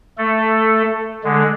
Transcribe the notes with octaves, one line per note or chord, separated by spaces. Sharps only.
A3 A4
D3 G#3